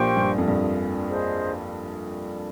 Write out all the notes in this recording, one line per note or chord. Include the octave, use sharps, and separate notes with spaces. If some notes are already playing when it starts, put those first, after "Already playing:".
Already playing: A#1 A#2 G4 C5 G5 C#6
G2
F2
G2
G#4 C5 D#5